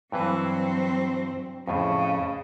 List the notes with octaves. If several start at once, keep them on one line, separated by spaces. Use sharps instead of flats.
G2 E3 F#3 C4 B4
F2 A2 C#3